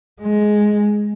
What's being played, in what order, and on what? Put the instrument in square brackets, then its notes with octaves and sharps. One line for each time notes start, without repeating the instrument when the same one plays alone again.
[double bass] G#3